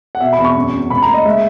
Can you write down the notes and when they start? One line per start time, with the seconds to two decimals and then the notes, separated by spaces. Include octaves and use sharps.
0.15 F#5
0.20 B2 E5
0.33 B5
0.39 E2
0.44 C#6
0.56 F#2
0.73 F#2
0.90 C#2 B5
1.02 A#5
1.08 A#3
1.14 D#5
1.25 G#3 E5